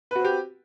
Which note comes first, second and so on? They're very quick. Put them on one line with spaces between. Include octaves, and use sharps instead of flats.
B4 F#4 C4 G4